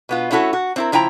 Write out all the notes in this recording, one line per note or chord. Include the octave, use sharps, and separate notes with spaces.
B2 B3 F4
A3 C#4 E4 F#4 A4
F#4
C4 E4 A#4
C#3 F3 E4 G5 A#5